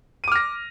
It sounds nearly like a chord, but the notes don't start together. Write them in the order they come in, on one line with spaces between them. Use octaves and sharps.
D#7 D6 F6 A#6